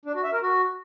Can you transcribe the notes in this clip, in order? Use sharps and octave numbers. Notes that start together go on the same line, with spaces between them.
D4
F#4
E5
A#4
F#4